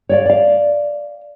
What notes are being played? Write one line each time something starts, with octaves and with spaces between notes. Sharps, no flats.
C#5 D5 F5
D5 F5